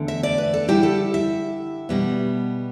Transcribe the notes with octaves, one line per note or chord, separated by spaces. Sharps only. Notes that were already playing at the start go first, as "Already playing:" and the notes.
Already playing: E2 D3 A3
E5
D5
B4
A4
D3 G3 E4 G4
A4
E5
B2 G3 B3